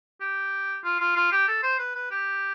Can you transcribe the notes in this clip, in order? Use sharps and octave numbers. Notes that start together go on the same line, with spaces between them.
G4
F4
F4
F4
G4
A4
C5
B4
B4
G4